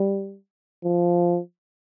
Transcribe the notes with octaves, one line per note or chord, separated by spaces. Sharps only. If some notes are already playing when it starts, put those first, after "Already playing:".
Already playing: G3
F3